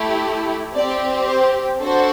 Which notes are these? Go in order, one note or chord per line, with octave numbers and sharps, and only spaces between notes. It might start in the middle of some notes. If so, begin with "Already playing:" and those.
Already playing: A3 E4 G4
C4 G4 D5
C5
D4 F#4 A4 C5